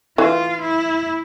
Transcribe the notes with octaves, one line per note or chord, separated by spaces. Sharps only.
E3 F4
E4